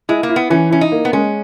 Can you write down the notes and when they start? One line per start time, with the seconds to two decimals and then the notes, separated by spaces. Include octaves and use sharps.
0.09 G#3 E4
0.23 A#3
0.29 E4
0.36 B3
0.50 E3 C#4
0.71 C#4 E4
0.81 D#4
0.92 A#3
1.05 B3
1.13 G#3 C#4